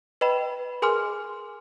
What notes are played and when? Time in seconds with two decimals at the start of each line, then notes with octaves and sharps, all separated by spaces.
0.21 B4 D#5 G5 B5 E7
0.82 G#4 A#4 G#5 C6 D6 F6